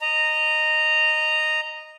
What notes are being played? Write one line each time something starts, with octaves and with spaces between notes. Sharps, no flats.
D#5 A#5